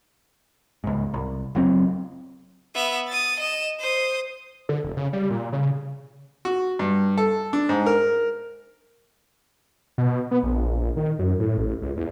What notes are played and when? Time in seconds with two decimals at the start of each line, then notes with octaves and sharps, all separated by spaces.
0.84 C#2 G#2
1.14 C2
1.55 F#1 F#3 C4
2.75 B3 E5
3.07 D#6 A6
3.40 D#5 E7
3.80 C5 D#6
4.69 D3
4.84 F1
4.97 C#3
5.13 G3
5.30 A#2
5.52 C#3
6.45 F#4
6.79 G2
7.18 A4
7.53 D4
7.69 G#2
7.86 A#4
9.98 B2
10.31 B3
10.43 A#1
10.97 D#3
11.19 F#2
11.39 A2
11.57 A1
11.82 C#2
11.97 E2